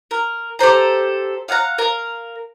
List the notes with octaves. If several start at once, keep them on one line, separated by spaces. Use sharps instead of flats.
A#4
G4 A4 C5 A#5
F5 F#5 G#5 A#5
A#4 F5